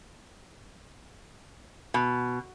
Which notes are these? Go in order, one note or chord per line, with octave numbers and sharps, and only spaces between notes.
B2